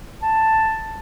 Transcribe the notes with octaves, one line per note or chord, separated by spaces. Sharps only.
A5